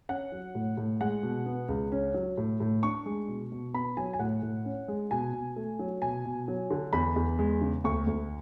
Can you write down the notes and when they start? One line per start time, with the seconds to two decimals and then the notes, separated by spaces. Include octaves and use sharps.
0.09 C#4 F#5
0.32 F#3
0.55 A2
0.77 A2
1.01 G#3 F#5
1.23 B2
1.46 B3
1.68 C#2
1.92 C#4
2.14 F#3
2.38 A2
2.60 A2
2.83 D4 C#6
3.06 G#3
3.28 B2
3.52 B2
3.74 B3 B5
3.97 F#3 G#5
4.13 G#5
4.19 A2 F#5
4.42 A2
4.65 C#4
4.88 G#3
5.11 B2 G#5
5.33 B2
5.56 A3
5.79 F#3
6.02 B2 G#5
6.25 B2
6.48 F#3
6.71 D3
6.93 E2 B5
7.16 E2
7.39 G#3
7.61 C#3
7.84 D2 C#6
8.07 D2